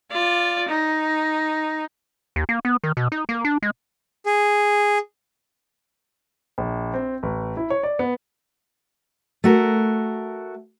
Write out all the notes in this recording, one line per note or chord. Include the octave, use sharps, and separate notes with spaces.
F4 D5
D#4
D#2
A#3
B3
D#3
B2
D#4
A#3
D4
G#3
G#4
A#1
C4
A1
E4
C#5
D5
B3
A3 F#4 A#4